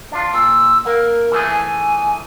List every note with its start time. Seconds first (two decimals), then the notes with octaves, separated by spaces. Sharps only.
0.12 D4 F4
0.34 A#2 E6
0.86 A#3 A#4
1.32 E3 A3 G#4
1.50 G#5